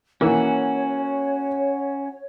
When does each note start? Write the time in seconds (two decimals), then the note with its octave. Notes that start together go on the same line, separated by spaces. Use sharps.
0.21 E3 A#3 C#4 F#4 C#5